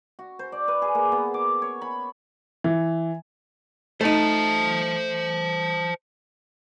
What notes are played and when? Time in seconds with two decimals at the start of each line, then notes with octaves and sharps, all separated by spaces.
0.19 F#4
0.39 C5
0.52 D5
0.68 B4
0.82 G#4
0.95 A#3
1.12 B3
1.34 D6
1.62 C#5
1.82 B5
2.64 E3
4.01 A3 D#4 C5 A5